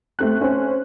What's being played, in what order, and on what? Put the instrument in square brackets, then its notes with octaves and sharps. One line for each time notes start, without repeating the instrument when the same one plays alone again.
[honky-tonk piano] A3 C4 F#6
C#4 C5